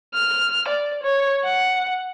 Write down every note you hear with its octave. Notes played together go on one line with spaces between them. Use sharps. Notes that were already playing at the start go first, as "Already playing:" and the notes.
F6
D5
C#5
F#5